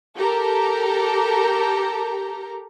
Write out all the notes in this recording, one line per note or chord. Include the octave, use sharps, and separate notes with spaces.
G4 A4 A#4 A#5